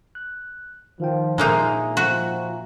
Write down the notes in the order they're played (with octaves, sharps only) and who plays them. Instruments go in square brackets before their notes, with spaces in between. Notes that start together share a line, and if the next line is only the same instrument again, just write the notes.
[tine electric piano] F#6
[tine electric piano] D#3 F5 G5 [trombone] F3
[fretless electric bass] A#2 D4 [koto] G#3 A#3 D#4 [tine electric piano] E5 G#5 A#5
[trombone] F3 [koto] F#4